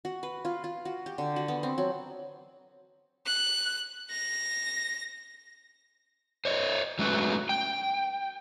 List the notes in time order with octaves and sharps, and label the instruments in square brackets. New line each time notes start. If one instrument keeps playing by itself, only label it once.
[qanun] F#4
B4
F4
F4
F#4
G4
D3
F#4
B3
C4
F#3
[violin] F#6
A#6
[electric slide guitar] C5 C#5 D#5
F#3 G#3 A3 C#4 F#4 B4
G5